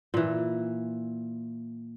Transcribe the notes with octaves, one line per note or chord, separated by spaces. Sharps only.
A#2 E3